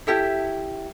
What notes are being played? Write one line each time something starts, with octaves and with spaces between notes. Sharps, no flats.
E4 G4 A4 E5